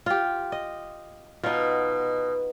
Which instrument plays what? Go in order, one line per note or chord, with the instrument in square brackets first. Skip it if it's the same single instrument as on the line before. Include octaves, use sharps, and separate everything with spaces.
[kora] F4 G4
D#5
[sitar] B2 [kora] D#4 F4